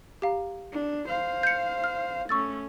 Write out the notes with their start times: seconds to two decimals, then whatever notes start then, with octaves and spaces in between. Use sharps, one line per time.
0.22 G4 F5 A#5
0.72 D4
1.08 C5 F5
1.43 G6 C#7
1.84 F6
2.29 A3 C#4 C#6 E6 A6